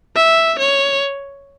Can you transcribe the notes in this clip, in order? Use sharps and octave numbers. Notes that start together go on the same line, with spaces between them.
E5
C#5